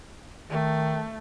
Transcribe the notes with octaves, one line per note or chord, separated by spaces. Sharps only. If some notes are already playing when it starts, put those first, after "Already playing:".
D#3 A3